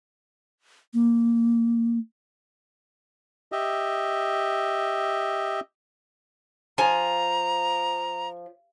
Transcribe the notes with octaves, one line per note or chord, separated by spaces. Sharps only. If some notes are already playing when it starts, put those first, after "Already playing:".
A#3
G4 D#5 E5
F3 G#5 A#5